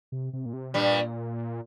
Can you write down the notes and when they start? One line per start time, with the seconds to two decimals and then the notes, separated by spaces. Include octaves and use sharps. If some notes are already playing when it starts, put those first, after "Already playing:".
0.12 C3
0.33 C3
0.46 A#2
0.53 C3
0.74 G2 A#2 G3